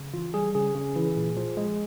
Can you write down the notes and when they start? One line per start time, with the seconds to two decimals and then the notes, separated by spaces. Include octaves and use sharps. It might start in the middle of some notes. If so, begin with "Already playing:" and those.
Already playing: C#3
0.13 E3 F4
0.34 G3 G#4
0.55 C#3 G#4
0.75 C#3
0.96 E3
1.16 A#2
1.37 F3
1.57 G#3